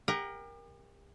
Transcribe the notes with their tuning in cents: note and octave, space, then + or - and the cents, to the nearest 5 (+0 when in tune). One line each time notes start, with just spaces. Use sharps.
G4 +40 A#4 +10 F#5 +40